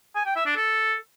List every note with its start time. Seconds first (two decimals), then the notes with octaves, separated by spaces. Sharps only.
0.16 G#5
0.26 G5
0.36 E5
0.46 D4
0.56 A4